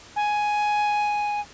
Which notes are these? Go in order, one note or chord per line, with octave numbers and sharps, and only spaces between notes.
G#5